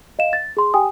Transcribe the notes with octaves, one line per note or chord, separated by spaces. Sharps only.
D#5 F5 E7
A6
G#4 C6
G4 G5 G#5 D#6